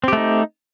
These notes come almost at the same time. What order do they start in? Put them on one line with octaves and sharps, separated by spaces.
C4 G4 A3 D#4